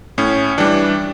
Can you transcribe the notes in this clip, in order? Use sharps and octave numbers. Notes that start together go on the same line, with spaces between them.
A2 C#4
E3 G3 D4